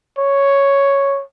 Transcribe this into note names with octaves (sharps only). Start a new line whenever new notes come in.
C#5